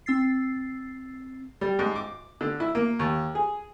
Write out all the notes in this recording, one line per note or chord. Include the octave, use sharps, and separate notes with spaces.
C4 E6 A6 C7
G3
G#2
D6
D3
E4
A#3
D#2
G#4